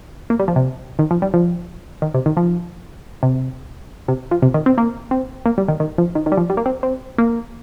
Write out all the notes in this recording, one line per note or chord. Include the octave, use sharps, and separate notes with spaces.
A#3
G3
F3
C3
D#3
F3
G3
F3
D#3
C3
D#3
F3
C3
C3
F3
C3
D#3
C4
A#3
C4
A#3
G3
D#3
D#3
F3
D#3
D#3
G3
F3
G3
A#3
C4
C4
A#3